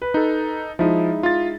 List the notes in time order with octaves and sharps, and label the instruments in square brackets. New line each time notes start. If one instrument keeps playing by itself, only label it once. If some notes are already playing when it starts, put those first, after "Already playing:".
[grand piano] B4
[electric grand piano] D#4 A4
[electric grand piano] F3 [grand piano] G#3 D#4 E4
[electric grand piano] F4 A6